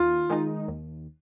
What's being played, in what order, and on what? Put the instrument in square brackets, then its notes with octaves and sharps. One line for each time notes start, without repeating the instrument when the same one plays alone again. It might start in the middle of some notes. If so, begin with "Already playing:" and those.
Already playing: [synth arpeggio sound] D#2 [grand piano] F4
[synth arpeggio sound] D#3 G#3 D#4
D#2